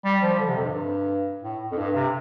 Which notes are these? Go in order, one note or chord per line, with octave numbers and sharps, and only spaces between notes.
G3
F3
D3
C3
F2
G2
A2
F2
G2
C3